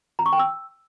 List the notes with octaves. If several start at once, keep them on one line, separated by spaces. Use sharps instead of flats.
A#5
C#6
G5
E6